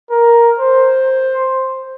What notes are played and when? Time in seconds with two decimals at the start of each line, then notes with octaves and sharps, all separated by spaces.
0.11 A#4
0.60 C5